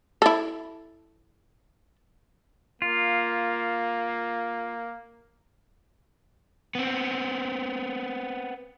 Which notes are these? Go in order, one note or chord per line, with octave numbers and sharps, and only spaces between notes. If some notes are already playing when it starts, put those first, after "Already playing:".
E4 A4
A#3 F4
B3 C4